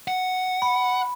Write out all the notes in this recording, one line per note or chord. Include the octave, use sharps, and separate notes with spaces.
F#5
B5